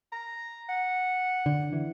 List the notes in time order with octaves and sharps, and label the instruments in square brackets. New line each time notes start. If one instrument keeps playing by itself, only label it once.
[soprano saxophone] A#5
F#5
[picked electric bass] D3
E3